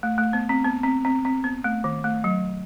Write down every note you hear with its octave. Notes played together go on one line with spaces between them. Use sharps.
A3
A3
B3
C4
B3
C4
C4
C4
B3
A3
D#3
A3
F#3